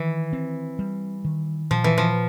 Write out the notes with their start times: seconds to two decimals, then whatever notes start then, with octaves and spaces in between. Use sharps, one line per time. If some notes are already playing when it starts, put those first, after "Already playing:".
Already playing: D#3 E3
0.33 C4
0.79 G3
1.25 D#3
1.71 A#2 F3
1.84 E3
1.98 F3